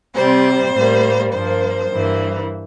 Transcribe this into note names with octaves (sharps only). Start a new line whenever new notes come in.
C3 G3 C4 C5
A2 G3 A#3
G2 F3 A#3 C5
G2 E3 A#3